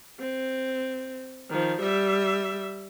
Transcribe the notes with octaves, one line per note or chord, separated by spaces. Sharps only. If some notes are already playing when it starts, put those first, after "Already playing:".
C4
D#3 F3
G3 E5